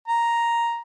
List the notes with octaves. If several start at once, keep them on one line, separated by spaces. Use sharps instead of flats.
A#5